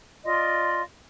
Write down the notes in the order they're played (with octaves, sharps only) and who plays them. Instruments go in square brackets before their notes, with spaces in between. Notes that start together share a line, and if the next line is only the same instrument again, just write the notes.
[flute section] F4 D5 D#5 C6